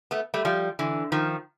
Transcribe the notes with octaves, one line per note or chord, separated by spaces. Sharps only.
A3 B3
G3 A3
F3 G3
D3 E3
D#3 F3